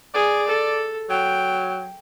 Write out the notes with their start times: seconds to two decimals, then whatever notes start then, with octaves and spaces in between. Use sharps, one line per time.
0.14 G#4 D5
0.48 A4
1.10 F#3 G5